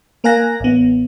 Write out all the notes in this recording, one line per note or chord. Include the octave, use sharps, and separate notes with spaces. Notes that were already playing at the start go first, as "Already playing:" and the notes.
A#3 A#4 F5 G#5 F#6 A#6
A1 B3